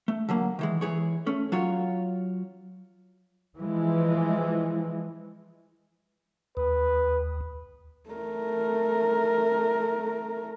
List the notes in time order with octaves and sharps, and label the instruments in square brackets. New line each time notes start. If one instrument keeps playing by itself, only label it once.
[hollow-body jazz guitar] A3
D3 F#3 A#3
D#3 E3 G#3
E3 G#4 C#5
A3 C#4
F#3 F4 C#5
[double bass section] E3 F3 G#3
[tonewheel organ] D#2 [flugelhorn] B4
[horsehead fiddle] A3 A#4